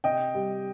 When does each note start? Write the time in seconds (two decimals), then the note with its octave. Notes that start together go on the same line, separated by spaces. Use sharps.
0.04 C3 D#5 G5
0.35 G3